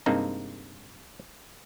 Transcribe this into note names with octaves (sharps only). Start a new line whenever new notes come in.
G2 C3 G#3 A#3 C4 D#4